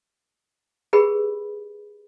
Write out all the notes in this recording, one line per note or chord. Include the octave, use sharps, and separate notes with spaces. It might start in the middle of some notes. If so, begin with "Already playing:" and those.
G4 G#4 A#4 B4 B5